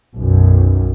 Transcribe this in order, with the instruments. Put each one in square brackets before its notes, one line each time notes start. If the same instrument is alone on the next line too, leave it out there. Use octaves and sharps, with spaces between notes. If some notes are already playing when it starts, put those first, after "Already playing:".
[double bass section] B1 F#2